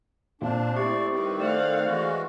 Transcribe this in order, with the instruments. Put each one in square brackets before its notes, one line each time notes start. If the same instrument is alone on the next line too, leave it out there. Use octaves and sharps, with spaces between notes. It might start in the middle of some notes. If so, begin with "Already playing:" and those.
[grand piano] A#2 [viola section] C4 [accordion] D4
[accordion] A3 D5 [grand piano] E4 [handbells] G4 C#6
[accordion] D#3 C4 [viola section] G3 B4
[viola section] A3 F5 F#5 [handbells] C5 D5
[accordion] E3 G#3 F#4